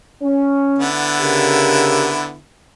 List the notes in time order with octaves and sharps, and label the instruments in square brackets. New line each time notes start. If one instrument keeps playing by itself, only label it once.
[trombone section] C#4
[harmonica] D3 B3 E4
[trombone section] C#3 G4 A#4